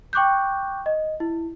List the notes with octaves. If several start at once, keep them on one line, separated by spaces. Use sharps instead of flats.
G5 C#6 D6 F#6 G6
D#5
E4